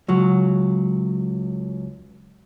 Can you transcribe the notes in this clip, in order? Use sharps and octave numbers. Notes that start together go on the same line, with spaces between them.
C#2 F#3